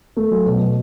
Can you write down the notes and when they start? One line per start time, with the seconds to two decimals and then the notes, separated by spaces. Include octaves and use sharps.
0.17 A3
0.31 F#3
0.46 B2
0.61 B2